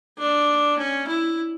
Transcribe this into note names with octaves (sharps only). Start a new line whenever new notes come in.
D4
C#4
E4